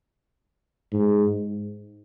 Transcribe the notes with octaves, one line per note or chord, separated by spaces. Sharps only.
G#2